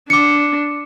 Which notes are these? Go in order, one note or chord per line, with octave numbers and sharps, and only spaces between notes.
D4 D6 C#7